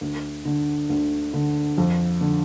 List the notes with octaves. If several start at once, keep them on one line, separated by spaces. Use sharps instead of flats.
D2
D3
D2
D3
F2
D3